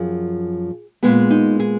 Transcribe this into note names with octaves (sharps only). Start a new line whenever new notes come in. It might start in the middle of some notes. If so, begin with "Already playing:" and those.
Already playing: F#2 F3 G#4
A#2 G#3 B3 G#4
D#4
G#4